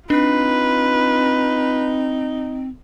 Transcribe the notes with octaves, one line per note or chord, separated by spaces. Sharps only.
C4 D4 D#4 F4 B4